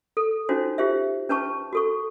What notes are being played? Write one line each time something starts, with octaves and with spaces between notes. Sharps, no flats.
A4
C#4 D#4 F4 F#4 C5
F4 G4 C5 E5
C#4 B4 A5 C#6
F#4 A4 C#6